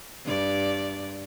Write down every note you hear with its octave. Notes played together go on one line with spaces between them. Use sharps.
G2 D5